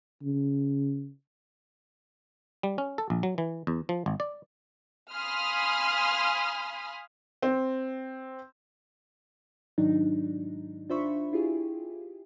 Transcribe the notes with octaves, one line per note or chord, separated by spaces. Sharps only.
C#3
G3
C#4
A4
A#1
F#3
E3
E2
F3
G#1
D5
F5 G#5 B5 C6 D#6 F6
C4
G#2 D#3 F#3 D4 D#4
D4 F4 C5 E5 B5 C#6
E4 F4 G4 G#4